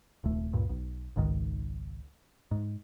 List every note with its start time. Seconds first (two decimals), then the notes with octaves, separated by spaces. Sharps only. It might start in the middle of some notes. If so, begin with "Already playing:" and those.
0.24 D#1 C2 A3
0.53 C#2 G2 A#2
0.69 B1
1.16 G#1 C#2 G#2 D#3
2.51 G#2